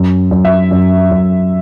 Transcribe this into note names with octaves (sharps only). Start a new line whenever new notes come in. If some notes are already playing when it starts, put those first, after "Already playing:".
Already playing: F#2
F#2
E5
F#2
F#2